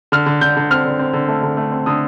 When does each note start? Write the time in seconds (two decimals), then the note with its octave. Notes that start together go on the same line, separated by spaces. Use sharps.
0.12 D3 F6
0.26 D3
0.41 D3 G6
0.57 D3
0.70 C4 F6
0.85 D3
0.99 C4
1.13 D3
1.28 A3
1.43 D3
1.57 A3
1.72 C4
1.86 D3 D#6